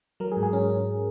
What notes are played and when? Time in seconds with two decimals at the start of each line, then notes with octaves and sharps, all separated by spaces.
0.20 F#3 A#4
0.32 G#4
0.37 G#2
0.43 G#4
0.53 C#4 A#4
0.70 C#4